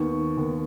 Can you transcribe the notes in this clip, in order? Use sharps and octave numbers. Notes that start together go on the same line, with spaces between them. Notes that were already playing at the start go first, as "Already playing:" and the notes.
Already playing: D#2 D#3 B3 C#6
D#2 D#3 B3